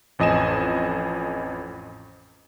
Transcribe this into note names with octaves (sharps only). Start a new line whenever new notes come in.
A1 F2 D#5 G#5 E7